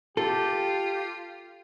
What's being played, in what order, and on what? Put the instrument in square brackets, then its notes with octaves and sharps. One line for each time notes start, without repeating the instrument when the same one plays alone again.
[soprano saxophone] F4 [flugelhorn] G4 [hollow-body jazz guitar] A4